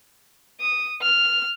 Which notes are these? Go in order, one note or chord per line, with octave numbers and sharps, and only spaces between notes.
D#6
F6